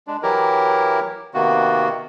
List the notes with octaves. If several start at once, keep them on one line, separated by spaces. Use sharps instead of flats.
G#3 D4
E3 F#3 E4 G4 A#4
C3 D#3 A#3 B3 F#4